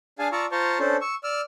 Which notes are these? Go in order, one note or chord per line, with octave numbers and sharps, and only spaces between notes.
D4 G#4 F5 G#5 A5
F4 D5 A5 A#5 C#6 E6
F4 C5 A5 A#5 C6 C#6
C#4 D4 A4 C5
C#6 E6
D5 E6 F6